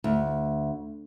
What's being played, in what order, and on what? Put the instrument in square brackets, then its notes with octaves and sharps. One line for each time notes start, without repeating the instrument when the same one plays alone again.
[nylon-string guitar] D2